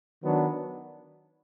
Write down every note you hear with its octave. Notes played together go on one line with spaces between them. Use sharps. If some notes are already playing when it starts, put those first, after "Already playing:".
D#3 F#3 B3 D4